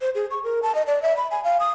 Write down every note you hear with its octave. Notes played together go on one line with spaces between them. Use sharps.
C5
G#4
C#6
A#4
A5
D#5
D5
E5
B5
G#5
F5
D#6